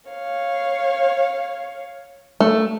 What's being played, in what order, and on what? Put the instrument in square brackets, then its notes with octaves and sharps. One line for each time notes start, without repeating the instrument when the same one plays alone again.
[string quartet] C#5 F5
[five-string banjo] A3